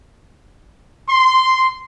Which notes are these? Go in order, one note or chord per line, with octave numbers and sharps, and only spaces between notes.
C6